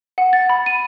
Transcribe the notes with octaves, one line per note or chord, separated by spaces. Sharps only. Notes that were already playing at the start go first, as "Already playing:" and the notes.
F#5
A6
B5
D#7